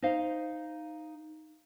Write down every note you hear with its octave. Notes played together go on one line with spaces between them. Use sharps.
D#4 C5 D#5 F5